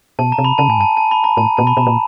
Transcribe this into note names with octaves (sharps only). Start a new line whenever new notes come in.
B2 A5
A#5
C3
B5
C#3 A5
A2 G#5
G2
A5
A5
B5
A#5
A2 A5
A#2 A5
B2 B5
B2 A#5
A#2